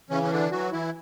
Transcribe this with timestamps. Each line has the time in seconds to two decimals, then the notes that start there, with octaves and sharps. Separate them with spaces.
0.10 C#3 E3 C#4
0.23 C#4
0.31 D3 D4
0.51 E3 F#3 F#4
0.72 E3 E4